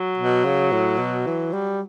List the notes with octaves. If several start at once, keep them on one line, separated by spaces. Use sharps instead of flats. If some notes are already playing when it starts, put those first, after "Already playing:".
Already playing: F#3
B2
C#3
A2
B2
E3
G3